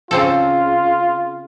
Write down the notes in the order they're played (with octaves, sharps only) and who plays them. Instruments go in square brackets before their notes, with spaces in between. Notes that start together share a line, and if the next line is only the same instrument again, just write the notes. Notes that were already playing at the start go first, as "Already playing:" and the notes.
[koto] C#3 C4 A4 [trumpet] F4